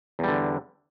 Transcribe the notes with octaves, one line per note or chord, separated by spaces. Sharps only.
E2 D3 G3